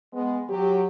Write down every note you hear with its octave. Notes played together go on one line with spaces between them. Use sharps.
G#3 B3
F#3 G4